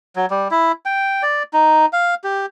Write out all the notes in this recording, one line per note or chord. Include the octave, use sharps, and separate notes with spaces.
F#3
G3
E4
G5
D5
D#4
F5
G4